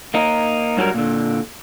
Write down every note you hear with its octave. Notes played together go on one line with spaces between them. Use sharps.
A#3 D#4
G2 F#3 G3 G#4 A#4
A#2 D3